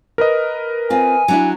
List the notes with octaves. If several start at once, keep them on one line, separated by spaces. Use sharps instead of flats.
A#4 B4 D#5
C4 F4 G#5
F#3 D4 E4